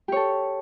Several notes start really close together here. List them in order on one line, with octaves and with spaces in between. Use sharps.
G4 C#5 A4